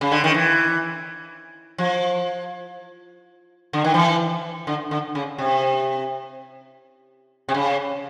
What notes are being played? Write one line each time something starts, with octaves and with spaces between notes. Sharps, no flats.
C#3
D3
D#3
E3
F3
D3
D#3
E3
D3
D3
C#3
C3
C3
C#3